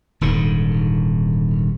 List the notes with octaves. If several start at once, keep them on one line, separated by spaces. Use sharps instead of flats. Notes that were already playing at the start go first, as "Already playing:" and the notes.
D#1 G#2 D3